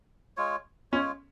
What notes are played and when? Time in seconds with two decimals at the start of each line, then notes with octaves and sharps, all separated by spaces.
0.37 G#3 F4 C#5
0.92 G#3 C#4 F4 C#5